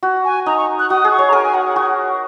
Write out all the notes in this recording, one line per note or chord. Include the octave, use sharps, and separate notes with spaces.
F#4
G#5
D#4 A#5
C#6
F#6
F#4 D#6
G#4
C#6
C#5
A#5
A#4 G#5
G#5
F#5
F#5
F#4 C#6